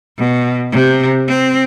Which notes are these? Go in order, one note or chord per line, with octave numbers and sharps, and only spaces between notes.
B2
C3
C4